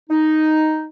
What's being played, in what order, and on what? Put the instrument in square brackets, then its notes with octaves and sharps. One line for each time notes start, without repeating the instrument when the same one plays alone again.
[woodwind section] D#4